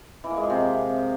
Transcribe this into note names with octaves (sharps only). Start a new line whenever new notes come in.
E3
A#3
G#3
F3
C3